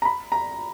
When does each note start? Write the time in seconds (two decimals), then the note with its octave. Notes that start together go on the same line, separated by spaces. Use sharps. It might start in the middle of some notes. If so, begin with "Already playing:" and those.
0.02 A#5
0.05 B5
0.32 A#5